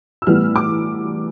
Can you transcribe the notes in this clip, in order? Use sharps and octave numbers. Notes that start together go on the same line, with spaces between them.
E6
A2 E3 G3 B3 F6
D6